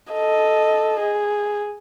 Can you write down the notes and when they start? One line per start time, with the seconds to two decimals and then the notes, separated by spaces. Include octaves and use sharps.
0.13 A4 D#5
1.00 G#4